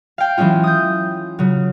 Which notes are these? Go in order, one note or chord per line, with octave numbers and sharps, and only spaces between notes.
F5 G5
E3 F#3 G#3 C#4 F4
D#6 G6
C#3 F#3